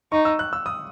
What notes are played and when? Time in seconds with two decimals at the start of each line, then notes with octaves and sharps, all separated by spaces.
0.12 D#4 C#6
0.25 E6
0.39 F#6
0.53 E6
0.66 D#6